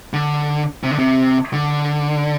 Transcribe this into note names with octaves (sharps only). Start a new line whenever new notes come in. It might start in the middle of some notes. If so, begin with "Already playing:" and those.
D3
C3
D3
C3
D3